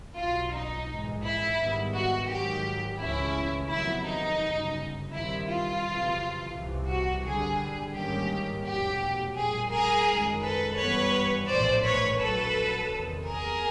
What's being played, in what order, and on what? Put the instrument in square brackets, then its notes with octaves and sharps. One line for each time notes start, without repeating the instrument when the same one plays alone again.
[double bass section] B1 B2 F#3 [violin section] F4
[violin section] D#4
[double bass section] A#1 G#2 E3 G#3
[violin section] E4
[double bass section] G#2 D#3 G3 B3
[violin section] F#4
[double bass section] G#2 D#3 F#3 [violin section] G4
[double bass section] C#2 C#3 E3 A3 C#4 [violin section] E4
[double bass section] F2 C3 D#3 F#3 B3 [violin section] E4
[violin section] D#4
[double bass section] G1 F#2 C#3
[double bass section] G2 D#3 G3 C4 [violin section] E4
[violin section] F4
[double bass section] F#1 F2 C3 E3
C2 C3 E3
[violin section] F#4
[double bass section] G2 D3 G3 [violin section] G#4
[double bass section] G#2 D#3 G3 A#3 C#4 [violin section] G4
[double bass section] F1 E2 B2 F#3 A3 [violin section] G4
[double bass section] A#1 A#2 G3 [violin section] G#4
[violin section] G#4 A#4
[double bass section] F#2 D#3 G#3
[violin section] A4 B4
[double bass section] G2 E3 G3 B3 [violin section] B4 C#5
[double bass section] A#1 A2 E3 A3 [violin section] C5 D5
[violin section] B4 C#5
[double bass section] A#1 A#2 F#3 [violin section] A4 B4
[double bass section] E2 C3 D#3
[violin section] G#4 A#4